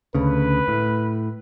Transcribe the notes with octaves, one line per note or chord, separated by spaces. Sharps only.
D2 C#3 B4
A2